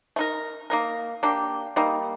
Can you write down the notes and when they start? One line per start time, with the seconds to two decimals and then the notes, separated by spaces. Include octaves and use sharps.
0.16 A3 D#4 A#4
0.70 A#3 D#4 A#4
1.23 A#3 D4 G4
1.76 G3 A#3 D#4